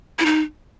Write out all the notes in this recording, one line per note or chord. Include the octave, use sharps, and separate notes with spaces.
E4
D#4